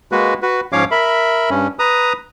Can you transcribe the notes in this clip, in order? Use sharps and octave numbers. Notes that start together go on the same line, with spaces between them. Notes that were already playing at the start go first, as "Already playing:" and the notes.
G#3 A#3 F#4 B4
F#4 B4
G#2 F3 C#4 C#5 F5 D6
A#4 E5 B5
G2 C#4
B4 A#5 D#6